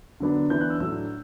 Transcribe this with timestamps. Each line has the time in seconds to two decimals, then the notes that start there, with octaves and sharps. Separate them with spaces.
0.20 D3 F#3 B3 D4
0.50 E3 B3 D4 G6
0.61 F#6
0.70 E6
0.80 A2 F#3 A3 D4 E6